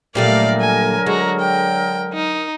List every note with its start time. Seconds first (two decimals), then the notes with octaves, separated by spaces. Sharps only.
0.15 A#2 D3 F#3 G3 A3 A#4 D5 F5
0.60 G#5
1.06 G#3 F#4 A#5
1.39 G5
2.13 D#4